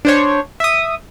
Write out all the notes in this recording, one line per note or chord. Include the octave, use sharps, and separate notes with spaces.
D4 C5 C#5
E5 D#6